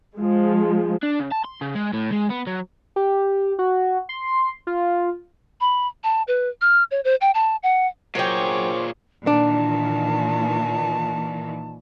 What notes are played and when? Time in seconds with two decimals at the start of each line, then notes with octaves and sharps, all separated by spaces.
0.16 F3 G#3
1.03 D4
1.20 C#3
1.32 A5
1.45 C6
1.61 C#3
1.75 G#3
1.93 A2
2.12 G#3
2.30 B3
2.47 F#3
2.96 G4
3.59 F#4
4.09 C6
4.67 F4
5.61 B5
6.03 A5
6.28 B4
6.61 F6
6.91 C#5
7.04 C5
7.21 G5
7.34 A5
7.63 F#5
8.15 A#2 F#3 G#4 C5 C#5 G5 D6
9.27 A#2 D#3 E3 D4 A5